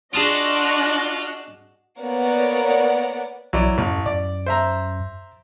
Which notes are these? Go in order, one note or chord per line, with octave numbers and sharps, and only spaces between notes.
D4 F4 F#4 G#4 D#5 A5 D#6 F#6
A#3 B3 A#4 C#5 D5 F#5
B1 F#3 E4 D5
A1 F#2
F#2 D5
C5 E5 A#5